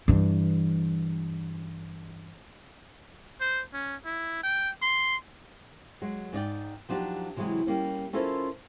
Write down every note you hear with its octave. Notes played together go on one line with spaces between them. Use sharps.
G2 E3
C5
C#4
E4
G5
C6
F#3 G#3
G#2 D#4 D5 G5
F3 F#3 D4 D#4 G4
C3 E3 F#3 G#3
G3 A#3 C#4
C#4 E4 F4 A4 A#4 C5